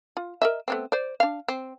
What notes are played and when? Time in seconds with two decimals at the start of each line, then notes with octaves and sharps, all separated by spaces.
0.17 F4
0.42 A#4 D#5 E5
0.68 A3 B3 C4
0.92 C5 D5
1.20 D4 F5
1.48 C4